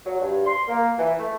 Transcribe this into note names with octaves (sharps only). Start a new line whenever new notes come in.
F#3
G2
C6
A#3
E3
A3